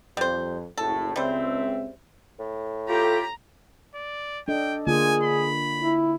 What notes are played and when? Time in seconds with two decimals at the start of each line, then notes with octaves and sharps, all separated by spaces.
0.17 F2 G3 C5
0.78 F#1 A2 A4
1.16 C#2 G3 C4 C5 E5
2.39 A2
2.89 F4 G4 A4 A#5
3.95 D5
4.48 D4 A4 D#5 G5
4.87 D3 A#3 F4 G#4 G#5
5.24 B5
5.80 E4